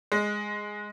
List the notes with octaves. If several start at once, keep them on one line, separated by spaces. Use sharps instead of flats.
G#3